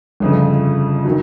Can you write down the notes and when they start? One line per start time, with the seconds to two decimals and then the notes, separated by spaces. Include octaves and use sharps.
0.20 G1 F2 C#3
1.05 D#3 F#3